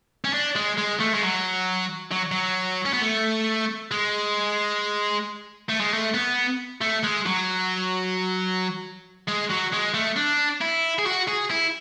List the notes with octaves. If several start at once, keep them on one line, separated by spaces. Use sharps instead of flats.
C#4
D4
G#3
G#3
A3
G#3
F#3
F#3
F#3
C#4
B3
A3
G#3
A3
G#3
A3
B3
A3
G#3
F#3
G#3
F#3
G#3
A3
D4
E4
G#4
F#4
G#4
E4